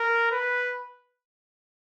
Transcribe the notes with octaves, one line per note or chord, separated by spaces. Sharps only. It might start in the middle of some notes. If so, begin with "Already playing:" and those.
Already playing: A#4
B4